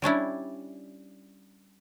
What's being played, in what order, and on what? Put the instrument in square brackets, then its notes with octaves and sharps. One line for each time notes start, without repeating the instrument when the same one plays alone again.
[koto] G3 C#4 D4 E4